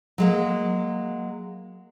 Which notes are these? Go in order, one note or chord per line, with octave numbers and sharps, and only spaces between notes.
F#3 G#3 A#3